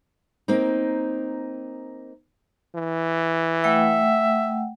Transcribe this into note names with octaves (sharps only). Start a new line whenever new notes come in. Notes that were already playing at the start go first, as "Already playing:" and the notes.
A#3 C4 D#4
E3
A3 E5 F#5 G5